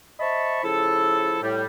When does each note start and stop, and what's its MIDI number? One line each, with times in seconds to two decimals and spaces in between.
0.20 0.63 72
0.20 0.63 75
0.20 0.63 76
0.20 0.63 81
0.20 0.63 83
0.20 0.63 85
0.64 1.38 49
0.64 1.38 53
0.64 1.38 64
0.64 1.38 69
1.43 1.65 45
1.43 1.65 55